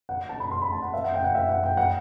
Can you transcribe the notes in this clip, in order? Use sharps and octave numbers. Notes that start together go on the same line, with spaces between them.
F#5
A5
B5
C6
B5
A5
F#5
E5
F#5
G5
F#5
E5
F#5
G5
F#5